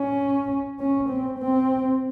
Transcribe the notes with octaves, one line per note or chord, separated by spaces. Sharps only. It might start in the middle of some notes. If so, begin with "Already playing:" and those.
Already playing: C#4
C#4
C4
C4